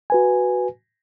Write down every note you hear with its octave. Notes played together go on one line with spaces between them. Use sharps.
F#4 B4 G#5